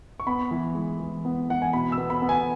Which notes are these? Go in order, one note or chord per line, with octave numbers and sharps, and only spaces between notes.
C#6
B3 B5
E3
G#3
E3
B3
E3 F#5
G#5
B2 B5
E6
B3
B5
B3
G#5